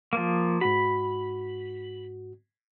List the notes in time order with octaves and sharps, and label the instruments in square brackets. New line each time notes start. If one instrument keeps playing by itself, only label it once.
[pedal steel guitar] F3 A#3
[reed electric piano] G#2 F#4 [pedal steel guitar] B5